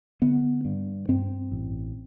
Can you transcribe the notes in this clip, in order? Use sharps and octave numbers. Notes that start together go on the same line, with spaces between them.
D3 B3
G2
G2 C4
A1